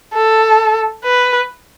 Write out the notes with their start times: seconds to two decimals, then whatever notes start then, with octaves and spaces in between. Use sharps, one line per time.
0.14 A4
1.04 B4